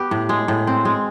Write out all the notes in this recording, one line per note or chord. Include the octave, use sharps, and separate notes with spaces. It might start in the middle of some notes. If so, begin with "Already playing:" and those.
Already playing: B3 G4
A2
G#3
A2
C4
G#3